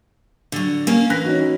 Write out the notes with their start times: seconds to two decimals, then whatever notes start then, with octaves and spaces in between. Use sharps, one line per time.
0.52 D3 F#3
0.87 A#3 C#4
1.10 E3 F#6 A#6 B6
1.24 C#4 D#4 F#4